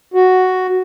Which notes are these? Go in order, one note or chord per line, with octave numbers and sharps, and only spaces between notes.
F#4